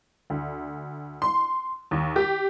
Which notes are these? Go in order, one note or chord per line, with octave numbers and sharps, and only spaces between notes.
D2
C6
D#2
G4